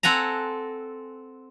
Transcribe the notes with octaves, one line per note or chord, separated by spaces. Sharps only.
C4 A4 F#5 G#5 A#5